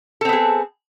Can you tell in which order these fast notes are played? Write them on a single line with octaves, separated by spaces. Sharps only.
A4 C4 B3 G#4